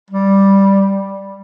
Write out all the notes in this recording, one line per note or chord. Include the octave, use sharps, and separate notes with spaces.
G3